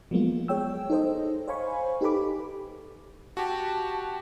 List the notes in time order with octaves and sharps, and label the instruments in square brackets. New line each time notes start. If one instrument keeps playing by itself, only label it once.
[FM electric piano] F3 F#3 G#3 A#3 B3 F4
G#4 C#5 G5 E6
D#4 A4 C5 D#5
C5 C#5 F5 G#5 B5 C#6
D#4 G4 A4 B4 B5 D6
[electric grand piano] F#4 G4 [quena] A5